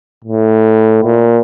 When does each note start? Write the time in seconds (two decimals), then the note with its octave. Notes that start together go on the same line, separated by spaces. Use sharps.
0.25 A2
1.04 A#2